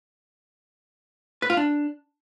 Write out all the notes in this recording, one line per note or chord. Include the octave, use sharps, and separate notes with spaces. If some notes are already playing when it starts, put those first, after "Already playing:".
B4
F4
D4